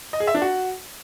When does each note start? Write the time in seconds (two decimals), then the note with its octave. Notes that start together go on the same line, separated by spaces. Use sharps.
0.13 D#5
0.20 G#4
0.27 E5
0.35 D4
0.42 F#4